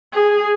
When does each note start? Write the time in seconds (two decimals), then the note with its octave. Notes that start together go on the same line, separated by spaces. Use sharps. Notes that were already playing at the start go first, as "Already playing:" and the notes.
0.13 G#4